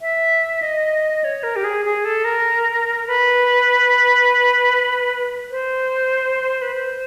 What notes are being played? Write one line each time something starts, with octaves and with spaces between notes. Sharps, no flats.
E5
D#5
C#5
A#4
G4
G#4
G#4
A4
A#4
B4
C5
B4
C5